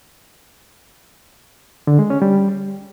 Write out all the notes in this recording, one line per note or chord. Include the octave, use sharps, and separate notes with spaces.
D3
G#3
C#4
G3